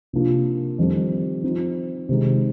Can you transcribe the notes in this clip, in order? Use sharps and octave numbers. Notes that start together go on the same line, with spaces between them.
C3 F3 A#3 D4 F4
F2 D#3 G3 C4
F3 C4 D#4
C3 D#3 G#3 D#4